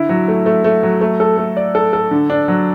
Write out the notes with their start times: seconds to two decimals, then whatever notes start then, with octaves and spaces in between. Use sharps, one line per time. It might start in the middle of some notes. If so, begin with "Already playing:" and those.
Already playing: D3 E4
0.09 F#3
0.28 A3
0.46 A3
0.64 A3
0.83 F#3
1.01 A3
1.20 A4
1.38 A3
1.57 D5
1.75 A4
1.93 A4
2.11 D3
2.30 D4
2.48 F#3